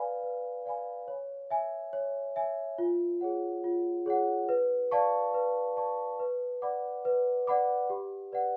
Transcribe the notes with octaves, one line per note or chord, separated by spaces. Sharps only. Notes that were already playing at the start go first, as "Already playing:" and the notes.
Already playing: B4 D5 F5 G#5 B5
B4
D5 F5 G#5 B5
C#5
E5 G#5
C#5
E5 G#5
F4
G#4 C#5 F#5
F4
G#4 C#5 F#5
B4
D5 F5 A5 C#6
B4
D5 F5 A5 C#6
B4
D5 F#5 B5 D6
B4
D5 F#5 B5 D6
G4
B4 D5 F#5